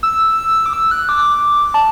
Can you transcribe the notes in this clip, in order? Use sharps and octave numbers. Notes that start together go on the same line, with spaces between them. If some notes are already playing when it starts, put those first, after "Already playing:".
E6
D6
E6
F#6
D6
A5